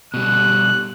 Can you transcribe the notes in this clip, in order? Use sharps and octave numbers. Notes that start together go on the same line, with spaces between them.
B2 G3 F#6